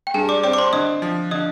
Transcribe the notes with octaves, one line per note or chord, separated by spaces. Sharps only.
G5
G2 G#4 G#5
D5 D6
C4 D5 D6
D6
C5 C6
D3 D#5 D#6
F3
D3 D#5 D#6